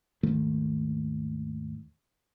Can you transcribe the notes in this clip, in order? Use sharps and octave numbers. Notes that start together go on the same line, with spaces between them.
D#2 G#2 D#3 A3